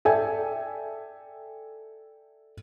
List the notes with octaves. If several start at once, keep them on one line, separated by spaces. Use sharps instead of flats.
A4 D5 E5 G5 G#5